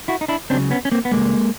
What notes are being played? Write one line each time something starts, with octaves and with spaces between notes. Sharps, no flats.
E4 F#4
D#4
D4 E4
C#2 C#3 F#3 C4 D4
B3 C#4
C#4
A#3 C4
B3
C#2 B2 G3 G#3 A#3